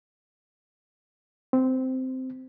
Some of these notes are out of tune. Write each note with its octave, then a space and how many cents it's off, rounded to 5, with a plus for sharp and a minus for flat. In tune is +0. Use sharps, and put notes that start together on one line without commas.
C4 -10